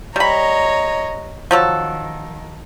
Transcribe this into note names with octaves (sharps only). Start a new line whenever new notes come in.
G3 C#5 D#5 A#5 B5
D#3 F3 F#3 A4